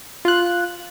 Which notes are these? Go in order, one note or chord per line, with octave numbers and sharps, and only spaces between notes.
F4 F#6